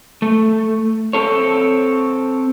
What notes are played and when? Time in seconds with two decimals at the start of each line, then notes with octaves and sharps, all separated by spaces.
0.22 A3
1.13 C4 A4 C#5